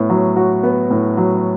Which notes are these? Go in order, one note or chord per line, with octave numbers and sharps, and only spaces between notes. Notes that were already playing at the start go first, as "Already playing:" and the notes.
Already playing: A2 B3
F#3
F#4
B3
A2
F#3